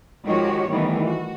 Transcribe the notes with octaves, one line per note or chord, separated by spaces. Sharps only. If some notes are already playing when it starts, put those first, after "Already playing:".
D#3 F3 G#3 F#4 G4 C#5
D#3 E3 G3 A3 B3
F#4